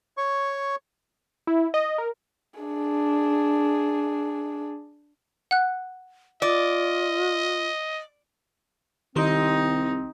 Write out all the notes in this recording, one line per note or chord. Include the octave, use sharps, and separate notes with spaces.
C#5 C#6
E4
D#5
A#4
D4 G#4
F#5 F#6
F4 D5 D#5
C2 D#3 C4 D#4 G4 D#5 C6